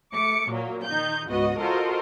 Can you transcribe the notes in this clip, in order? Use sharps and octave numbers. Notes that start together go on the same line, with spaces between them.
A3 D6 C#7
A#2 F#3 A#3
D#3 D#4 G6
C#2 G#2 B3 F#4 D#5
F4 F#4 A4 A#4 C5 D#5